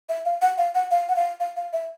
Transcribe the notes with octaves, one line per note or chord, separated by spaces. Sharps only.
E5
F5
F#5
F5
F#5
F5
F#5
F5
F5
F5
E5